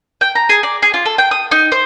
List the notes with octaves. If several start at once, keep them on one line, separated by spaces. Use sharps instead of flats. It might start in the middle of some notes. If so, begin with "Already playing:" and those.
G5
A#5
G#4
D5
G#4
F4
A4
G5
D#6
D#4
C5